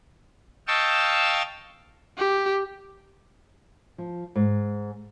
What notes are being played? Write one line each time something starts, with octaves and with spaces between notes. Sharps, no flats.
D#5 F5 G5 A5 C#6 E6
G4
F3
G#2